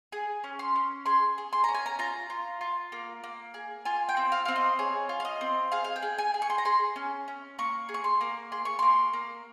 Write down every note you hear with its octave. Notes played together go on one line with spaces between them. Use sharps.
G#4
C#4
C6
C#4
G#4 C6
G#4
C6
C#4 A#5
G#5
A#5
F4 A#5
F4
F4
A#3
A#3
G#4
F4 G#5
G5
C4
F5
C4 F5
D#5
G#4 C#5
F4
F5
D#5
C4
G#4 F5
F5
G5
G#4
G#5
G#4
C#6
C6
A#5
G#4 C6
C#4
C#4
A#3 C#6
G#4
C#6
C6
A#3
G#4 C6
C#6
A#3 C6
A#3